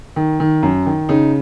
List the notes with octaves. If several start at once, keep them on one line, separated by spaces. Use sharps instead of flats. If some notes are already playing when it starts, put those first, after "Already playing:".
D#3
D#3
F#2
D#3
C#3 D#4